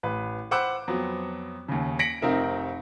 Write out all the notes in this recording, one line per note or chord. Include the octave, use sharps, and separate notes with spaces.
A1 B4
C5 F#5 B5 D6 E6 F#6
F2 F#3 B3
D#2 C#3
A#6 B6 C#7 D7 F#7
F1 C4 D#4 A#4 E5